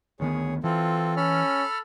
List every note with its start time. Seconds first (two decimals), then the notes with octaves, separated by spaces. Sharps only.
0.20 D2 D#3 B3 G#4 C#5
0.64 E3 C4 F4 A4
1.17 C#4 A4 B5 F6